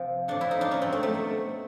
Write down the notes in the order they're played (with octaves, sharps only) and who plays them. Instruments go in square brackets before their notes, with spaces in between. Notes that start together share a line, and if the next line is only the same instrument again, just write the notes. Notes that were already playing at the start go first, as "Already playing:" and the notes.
Already playing: [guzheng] C3 F3
A2 F3 D4
E4
D#4
D4
B2 F#3 C#4
C4
A3
A3
B2 F#3